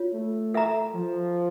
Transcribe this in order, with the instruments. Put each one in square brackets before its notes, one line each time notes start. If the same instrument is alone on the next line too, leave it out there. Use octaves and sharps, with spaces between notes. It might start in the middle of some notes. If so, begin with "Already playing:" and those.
Already playing: [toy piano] F4 C#5
[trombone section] A3
[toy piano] A4 E5 A#5
[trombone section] F3